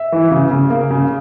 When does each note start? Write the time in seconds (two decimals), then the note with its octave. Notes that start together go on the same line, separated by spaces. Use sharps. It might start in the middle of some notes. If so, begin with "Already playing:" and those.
Already playing: E5
0.12 E3
0.31 C#3
0.51 C#3
0.70 A#3
0.91 C#3